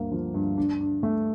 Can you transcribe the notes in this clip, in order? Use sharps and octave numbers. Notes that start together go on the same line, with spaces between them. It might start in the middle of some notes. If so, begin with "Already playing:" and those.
Already playing: D2 G2 A#3
F3
G2
D4
D4
A3